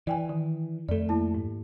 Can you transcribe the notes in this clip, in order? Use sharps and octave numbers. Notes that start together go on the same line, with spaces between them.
E3 D5 G5 G#5
D#3
F2 A3 A4 D5
A#3 E4 A5
G#2